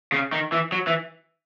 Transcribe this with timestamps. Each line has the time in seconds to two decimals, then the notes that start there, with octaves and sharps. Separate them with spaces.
0.12 C#3
0.32 D#3
0.52 E3
0.72 F#3
0.87 E3